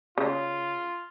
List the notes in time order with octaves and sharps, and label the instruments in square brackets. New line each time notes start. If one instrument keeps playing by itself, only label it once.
[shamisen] C#3 [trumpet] F4